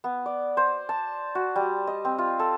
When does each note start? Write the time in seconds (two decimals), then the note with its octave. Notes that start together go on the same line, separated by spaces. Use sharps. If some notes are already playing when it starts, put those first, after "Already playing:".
0.04 B3
0.26 D5
0.57 C5
0.89 A5
1.35 F#4
1.56 G3
1.87 D#5
2.05 C4
2.18 F4
2.39 A4